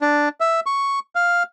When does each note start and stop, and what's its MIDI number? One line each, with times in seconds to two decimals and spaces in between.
0.01 0.29 62
0.40 0.60 76
0.66 0.99 85
1.15 1.43 77